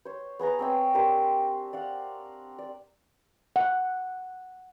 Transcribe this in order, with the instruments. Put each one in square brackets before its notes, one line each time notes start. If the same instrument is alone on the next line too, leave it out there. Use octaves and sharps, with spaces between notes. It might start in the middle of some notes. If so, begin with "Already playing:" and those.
[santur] C5 C#5
B3 G#4 B4 A#5
C4 C#5 G5
D4 G4 A#4 C5
D5 F5 F#5
D5
[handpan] F#5